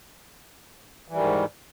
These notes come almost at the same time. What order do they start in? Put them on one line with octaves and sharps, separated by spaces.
E3 G3 D#3 G#2